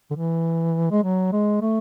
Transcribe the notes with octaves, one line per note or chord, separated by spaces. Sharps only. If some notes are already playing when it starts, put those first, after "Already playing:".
D3
E3
G#3
F#3
G#3
A3